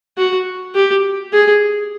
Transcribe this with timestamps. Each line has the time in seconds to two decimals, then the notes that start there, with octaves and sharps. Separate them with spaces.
0.18 F#4
0.75 G4
1.33 G#4